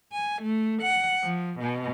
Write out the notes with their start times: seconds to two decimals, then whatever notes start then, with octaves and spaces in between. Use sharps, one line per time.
0.12 G#5
0.42 A3
0.82 F#5
1.23 F3
1.59 B2